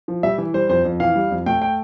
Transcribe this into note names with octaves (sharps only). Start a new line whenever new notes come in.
F3
G3 E5
E3
G3 C5
F2 C5
F2
E3 F5
G3
F2
A3 G5
G5